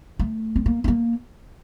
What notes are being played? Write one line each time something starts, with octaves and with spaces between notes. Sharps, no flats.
A3
C4
A#3
C4
A#3